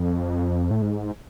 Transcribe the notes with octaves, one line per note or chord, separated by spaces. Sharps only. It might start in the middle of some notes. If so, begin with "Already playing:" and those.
Already playing: F2
A2
G#2